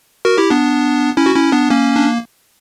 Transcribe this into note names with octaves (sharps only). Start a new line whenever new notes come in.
F#4 A#4
E4 G4
B3 D4
C#4 E4
F#4
C#4 E4
B3 D4
A#3 C#4
D4